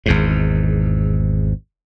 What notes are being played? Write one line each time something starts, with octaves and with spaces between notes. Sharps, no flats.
G#1 E2 G#2